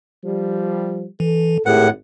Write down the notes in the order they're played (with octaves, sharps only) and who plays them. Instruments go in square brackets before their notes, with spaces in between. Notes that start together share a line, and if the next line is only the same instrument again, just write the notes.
[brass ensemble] F3 G3
[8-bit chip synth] E3 [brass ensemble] A4
[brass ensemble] G#1 [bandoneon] A2 F#5 [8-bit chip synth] G4 G#4 A#4